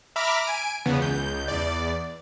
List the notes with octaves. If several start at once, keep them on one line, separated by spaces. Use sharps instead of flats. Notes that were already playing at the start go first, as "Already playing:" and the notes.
E5 A#5 B5 D6 F6
G#5 D7
E2 C#3 B3
C#2 G6
E2 D5